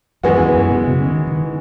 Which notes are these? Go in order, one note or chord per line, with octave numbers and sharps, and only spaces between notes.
F#2 E3 G#3 B3 F#4
E2
F#2
B2
C#3
D#3
D#3